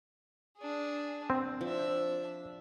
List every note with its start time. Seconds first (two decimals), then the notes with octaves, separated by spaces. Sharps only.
0.58 D4 G#4
1.30 C4
1.61 F3 D4 E5